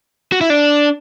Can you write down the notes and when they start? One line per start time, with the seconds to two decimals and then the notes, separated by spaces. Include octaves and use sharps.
0.32 F#4
0.41 E4
0.50 D4